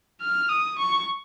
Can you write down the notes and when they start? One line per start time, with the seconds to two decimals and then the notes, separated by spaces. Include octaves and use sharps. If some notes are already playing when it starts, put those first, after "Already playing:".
0.22 F6
0.49 D#6
0.79 C#6